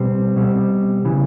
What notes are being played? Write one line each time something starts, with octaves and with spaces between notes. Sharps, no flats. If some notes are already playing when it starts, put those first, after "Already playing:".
Already playing: B2 G3 C4 C5
B2 G3 C4
C#3 E3 G3